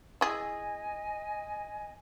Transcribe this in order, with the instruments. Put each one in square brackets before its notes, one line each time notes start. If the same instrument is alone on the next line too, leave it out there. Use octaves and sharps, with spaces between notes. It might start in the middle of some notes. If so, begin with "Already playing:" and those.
[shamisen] E4 G#4 [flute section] D#5 G#5